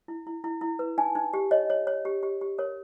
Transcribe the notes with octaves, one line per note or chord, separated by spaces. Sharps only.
E4
E4
E4
E4
B4
D#4 G#5
D#4
G4
C#5 D#5
C#5
C#5
G4
G4
G4
A#4 C#5